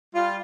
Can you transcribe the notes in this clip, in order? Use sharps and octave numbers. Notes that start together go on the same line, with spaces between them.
G3 F4